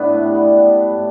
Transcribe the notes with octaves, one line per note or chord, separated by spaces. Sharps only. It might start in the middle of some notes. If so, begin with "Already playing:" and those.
Already playing: A2 B3 D4
A3
G3
B3
G3 B3
B3
A2